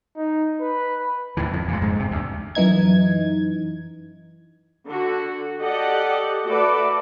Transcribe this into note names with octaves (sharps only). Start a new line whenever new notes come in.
D#4
B4
D2 A2 E3
F2
A#2 G#3
G#2 G#3
C3
D2
F#2 E3 D#4 G#6
D3 F#4
G4 A4 D5 D#5 F#5
A3 F#4 A4 B4 D5